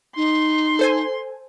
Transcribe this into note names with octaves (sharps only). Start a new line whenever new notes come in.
D#4 C6
A4 C5 G#5